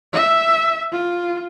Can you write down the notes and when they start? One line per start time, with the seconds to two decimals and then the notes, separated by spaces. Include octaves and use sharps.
0.13 E5
0.92 F4